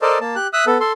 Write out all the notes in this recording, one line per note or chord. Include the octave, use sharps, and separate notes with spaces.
A4 A#4 C5 D5 D#5 A5
A#3 A5
G4 F#6
E5 D#6 E6 F#6
B3 A4
A4 C6